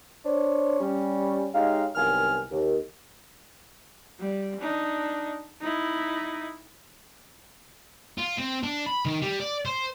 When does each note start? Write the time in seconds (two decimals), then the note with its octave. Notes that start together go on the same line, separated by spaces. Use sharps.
0.25 D4 C5 C#5
0.80 G3 C#4
1.54 G#3 D#4 G4 C#5 F5
1.96 C2 D#3 F#3 B3 G#5 F6
2.51 D#2
4.20 G3
4.60 D4 D#4
5.61 D#4 E4
8.18 F4
8.38 C4
8.63 D4
8.86 B5
9.06 D#3
9.22 G3
9.40 D5
9.65 C5